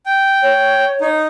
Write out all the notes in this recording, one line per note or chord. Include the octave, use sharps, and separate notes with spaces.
G5
C#5
D#4